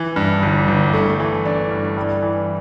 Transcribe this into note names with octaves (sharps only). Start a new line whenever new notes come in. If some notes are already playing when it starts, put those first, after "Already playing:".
Already playing: E3
G2
G1
G1
A3
E3
D4
G2
G3
E3